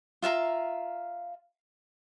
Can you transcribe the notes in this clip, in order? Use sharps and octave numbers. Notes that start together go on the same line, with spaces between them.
F4 E5 F5 A#5